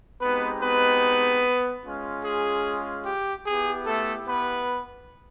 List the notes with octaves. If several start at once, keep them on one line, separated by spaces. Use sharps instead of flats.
G#3 B3 C4 D#4 G4 B4
B3 B4
G#3 C#4 F4
G#4
G4
B3 E4 G4 G#4
A3 A4
B3 B4